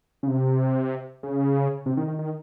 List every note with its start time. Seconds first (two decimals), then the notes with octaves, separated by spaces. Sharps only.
0.23 C#3
0.28 C3
1.23 C#3
1.86 C3
1.97 D#3
2.08 D#3
2.19 D#3